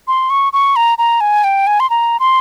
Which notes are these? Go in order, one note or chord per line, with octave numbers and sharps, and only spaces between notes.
C6
C#6
C#6
A#5
A#5
G#5
G5
G#5
C6
A#5
C6